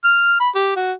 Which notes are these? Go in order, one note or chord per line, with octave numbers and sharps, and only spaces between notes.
F6
B5
G4
F#4